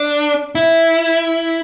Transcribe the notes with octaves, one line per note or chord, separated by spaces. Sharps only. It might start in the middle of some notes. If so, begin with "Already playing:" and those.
Already playing: D4
E4